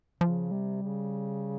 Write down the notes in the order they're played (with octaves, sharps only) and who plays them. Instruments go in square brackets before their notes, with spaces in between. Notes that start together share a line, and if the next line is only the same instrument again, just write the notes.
[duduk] C#3 [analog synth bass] F3
[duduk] C3 [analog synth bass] G3
[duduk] C#3